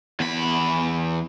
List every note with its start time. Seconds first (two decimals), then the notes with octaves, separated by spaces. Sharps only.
0.20 E2 B5